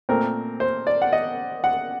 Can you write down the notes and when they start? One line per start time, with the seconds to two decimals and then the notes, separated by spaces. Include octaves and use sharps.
0.09 A#2 A3 C4 A#4
0.60 C5
0.87 D5
1.02 F#5
1.13 D#5
1.64 F#5